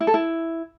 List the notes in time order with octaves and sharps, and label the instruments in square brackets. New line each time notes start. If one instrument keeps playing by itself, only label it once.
[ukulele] E4
A4
E4